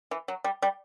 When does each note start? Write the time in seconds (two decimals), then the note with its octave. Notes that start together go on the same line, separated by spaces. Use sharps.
0.11 E3
0.28 F#3
0.44 G3
0.62 G3